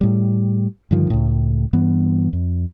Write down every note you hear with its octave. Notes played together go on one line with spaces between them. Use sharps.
A2 G3
G2 D3 D#3 F3
C#2 A2
G2 E3 B3
F2